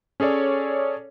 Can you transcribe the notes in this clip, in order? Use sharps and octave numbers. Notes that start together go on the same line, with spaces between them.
C#4 G#4 A4 C#5 D5